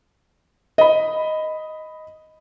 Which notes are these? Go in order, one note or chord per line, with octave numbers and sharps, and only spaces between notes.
D#5 B5